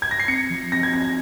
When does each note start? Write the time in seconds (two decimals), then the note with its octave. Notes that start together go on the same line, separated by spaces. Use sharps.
0.02 G#6
0.11 A#6
0.20 C7
0.28 C4 C#7
0.50 F3
0.72 C4 A#6
0.83 G#6
0.94 C4 A#6